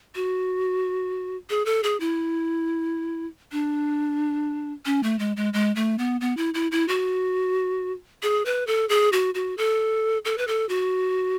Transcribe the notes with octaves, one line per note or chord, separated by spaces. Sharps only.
F#4
G#4
A4
G#4
E4
D4
C#4
A3
G#3
G#3
G#3
A3
B3
B3
E4
E4
E4
F#4
G#4
B4
A4
G#4
F#4
F#4
A4
A4
B4
A4
F#4